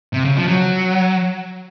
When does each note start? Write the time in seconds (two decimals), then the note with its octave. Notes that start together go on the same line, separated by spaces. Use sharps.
0.14 C3
0.25 C#3
0.37 F3
0.48 F#3